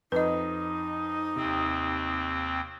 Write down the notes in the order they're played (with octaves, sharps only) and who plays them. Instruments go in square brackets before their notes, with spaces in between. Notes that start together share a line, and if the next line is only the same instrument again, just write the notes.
[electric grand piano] F2 [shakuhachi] D#4 [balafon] B4 D#5
[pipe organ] D#2 C4 [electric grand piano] C3